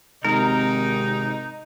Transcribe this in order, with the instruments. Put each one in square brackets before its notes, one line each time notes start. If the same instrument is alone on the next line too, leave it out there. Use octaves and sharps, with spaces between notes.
[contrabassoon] G#1 [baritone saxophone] C3 [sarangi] D#4 [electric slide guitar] A#4